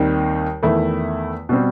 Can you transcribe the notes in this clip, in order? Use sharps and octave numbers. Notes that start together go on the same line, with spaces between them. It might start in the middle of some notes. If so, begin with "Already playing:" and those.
Already playing: D#2 D#3 G3 C4 D#4
E2 D#3 A3 E4
B2 G3 C4